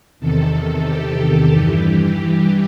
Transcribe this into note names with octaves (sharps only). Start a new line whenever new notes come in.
E2 C3 D#3 A4
G4
G2 E3